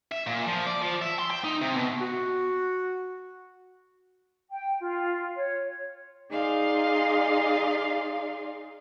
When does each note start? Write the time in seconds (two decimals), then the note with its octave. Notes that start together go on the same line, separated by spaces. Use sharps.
0.12 E5
0.27 A#2
0.46 F3
0.67 D5
0.82 F3
1.02 E5
1.19 C6
1.30 G5
1.44 D#4
1.61 C3
1.75 B2
2.01 F#4
4.50 G5
4.81 F4
5.35 C#5
6.29 D#4 G#4 D5 D#5 F5 C6